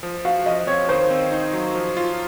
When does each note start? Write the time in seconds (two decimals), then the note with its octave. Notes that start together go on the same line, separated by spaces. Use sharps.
0.03 F3
0.25 F#4 F5
0.46 F3 D#5
0.67 C4 C#5
0.89 D#3 C5
1.10 C4
1.32 D#4
1.53 F#3
1.75 F3
1.97 F4